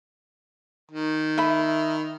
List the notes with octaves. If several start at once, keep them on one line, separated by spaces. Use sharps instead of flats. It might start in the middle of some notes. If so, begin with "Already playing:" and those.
D#3
E5 B5